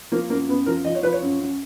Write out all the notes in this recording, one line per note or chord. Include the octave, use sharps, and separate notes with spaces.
F3 A#3
F#2 A#3
F#2 B3
F3 A#4
F3 D#5
C#5
F3 B4
C#5
F#2
F#2